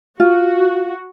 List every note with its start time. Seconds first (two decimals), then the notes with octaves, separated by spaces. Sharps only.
0.20 F4 F#4